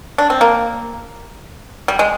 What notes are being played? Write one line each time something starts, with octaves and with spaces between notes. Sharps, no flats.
D4
C4
A#3
G3
G#3